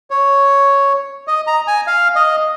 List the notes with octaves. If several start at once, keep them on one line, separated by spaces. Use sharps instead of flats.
C#5
D#5
A#5
G#5
F5
D#5